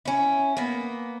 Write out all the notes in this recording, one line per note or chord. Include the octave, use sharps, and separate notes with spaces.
C#4 E4
A#3 B3